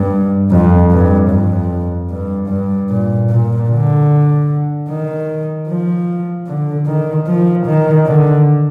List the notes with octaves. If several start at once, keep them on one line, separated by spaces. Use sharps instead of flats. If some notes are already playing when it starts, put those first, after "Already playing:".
Already playing: G2
F2
G2
F2
G2
G2
A#2
A#2
D3
D#3
F3
D3
D#3
F3
D#3
D3